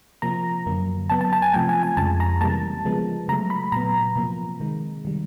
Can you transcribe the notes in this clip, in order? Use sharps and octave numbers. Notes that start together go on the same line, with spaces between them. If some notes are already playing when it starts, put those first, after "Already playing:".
C3 F3 A#3 A#5
F#2 D3 F#3 A#3
C#3 F#3 B3 A5
A5
A5
G#5
C3 F3 A3 G5
G#5
G#5
F2 C#3 F3 G#3 A5
A#5
C3 E3 G3 A#3 A5
C#3 F3 G#3 B3
C#3 F#3 A3 A#5
B5
A#2 F#3 B3 A#5
C3 F3 A#3
C3 D#3 G#3
D#3 G3